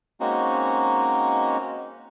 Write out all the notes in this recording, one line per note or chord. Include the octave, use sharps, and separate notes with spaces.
G#3 A#3 C4 C#4 D#4 F#4